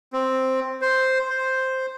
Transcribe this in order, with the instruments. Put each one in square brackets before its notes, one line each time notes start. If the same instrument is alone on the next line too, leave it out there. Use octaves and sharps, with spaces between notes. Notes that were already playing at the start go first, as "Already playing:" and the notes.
[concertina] C4
C5
C5